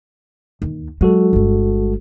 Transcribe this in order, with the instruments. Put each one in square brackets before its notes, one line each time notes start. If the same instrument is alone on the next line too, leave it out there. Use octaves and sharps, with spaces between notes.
[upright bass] D#2
[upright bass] F#3 [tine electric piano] G#3 F#4 A4
[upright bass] G1 G3